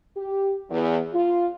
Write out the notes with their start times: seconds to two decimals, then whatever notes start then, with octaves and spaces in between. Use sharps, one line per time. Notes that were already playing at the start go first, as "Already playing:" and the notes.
0.16 G4
0.70 E2
1.14 F4